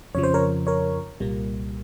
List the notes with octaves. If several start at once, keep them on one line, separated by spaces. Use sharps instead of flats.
F2 C#3 F3 C#5
C5
A#4 C#5
A#4 C#5
C2 A#2 G3 A#3